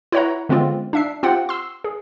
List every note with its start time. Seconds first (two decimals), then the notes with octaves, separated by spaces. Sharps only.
0.12 E4 B4 C#5 F#5 A#5
0.49 D3 G#3 B3 C4 F4
0.93 D4 E5 C7
1.23 C4 F4 G4 F#5 G5
1.49 C6 E6
1.84 G#4